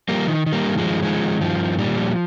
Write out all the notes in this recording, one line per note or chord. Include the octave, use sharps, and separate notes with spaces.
F3 G3 A#3
D#3
D#3
G3 A#3
G2
F3 G#3
D#3
D#3 F3 G#3
D#3
G2 F3
D#3
A#2 G3
F3